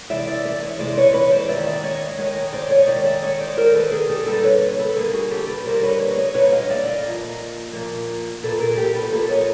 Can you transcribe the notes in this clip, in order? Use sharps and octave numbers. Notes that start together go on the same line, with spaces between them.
C3 E3 G#3 D5 E5
D5 E5
D5 E5
C#5 D#5
C3 E3 G#3 C5 D5
B4 C#5
B4 C#5
C5 D5
D#3 G#3 D5 E5
D5 E5
C#5 D#5
D#3 G#3 C#5 D#5
C#5 D#5
C5 D5
C#5 D#5
D#3 G#3 D5 E5
D5 E5
C#5 D#5
C5 D5
D#3 G#3 A#4 C5
A4 B4
G#4 A#4
G4 A4
D3 G3 A#3 A4 B4
B4 C#5
A4 B4
D3 G3 A#3 G#4 A#4
F#4 G#4
G4 A4
A4 B4
D3 G3 A#3 A#4 C5
B4 C#5
C#5 D#5
C#5 D#5
D3 G3 A#3 B4 C#5
D#5 F5
D5 E5
D#5 F5
A#2 F3 A#3
A#2 F3 A#3
A#2 F3 A#3 A4 B4
G#4 A#4
G4 A4
A4 B4
A#2 F3 A#3 A4 B4
C#5 D#5